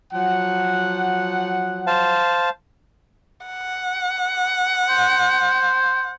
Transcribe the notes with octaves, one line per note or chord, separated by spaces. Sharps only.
F3 F#3 F#5
C5 F5 A5
F#5
C5